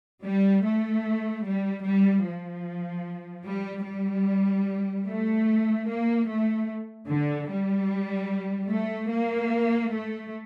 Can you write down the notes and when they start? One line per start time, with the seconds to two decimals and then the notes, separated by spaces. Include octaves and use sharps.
0.24 G3
0.64 A3
1.44 G3
1.85 G3
2.26 F3
3.46 G3
3.86 G3
5.07 A3
5.88 A#3
6.28 A3
7.08 D3
7.49 G3
8.69 A3
9.09 A#3
9.90 A3